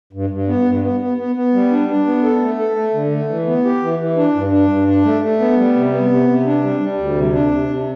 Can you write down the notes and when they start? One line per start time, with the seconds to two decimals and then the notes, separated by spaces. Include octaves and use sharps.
0.13 G2
0.30 G2
0.48 B3
0.65 G2
0.83 B3
1.00 B3
1.17 B3
1.35 B3
1.53 G3
1.71 D4
1.88 D4
2.06 B3
2.23 A4
2.41 A3
2.58 A4
2.76 A3
2.94 D3
3.11 A3
3.29 E3
3.47 B3
3.65 G4
3.82 E3
3.99 E3
4.17 D4
4.35 G2
4.52 D4
4.69 G2
4.88 D4
5.05 A3
5.22 A3
5.40 B3
5.57 G3
5.75 C3
5.93 B3
6.10 C3
6.28 C3
6.45 D4
6.63 G3
6.80 G3
6.98 D2
7.16 C3
7.33 D4
7.51 C3
7.69 C3